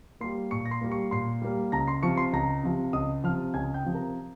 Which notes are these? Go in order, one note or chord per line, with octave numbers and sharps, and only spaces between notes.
G3 A#3 C6 C7
A#2 C#6 C#7
A#6
C6 C7
G3 A#3
C#6 C#7
A#2 C6 C7
G3 A#3
C#2 A#5 A#6
C6 C7
C3 F3 C#6 C#7
C6 C7
C#2 A#5 A#6
C3 F3
C#2 D#5 D#6
C3 F3 F5 F6
C#2 G#5 G#6
G5 G6
C3 F3
A#4 A#5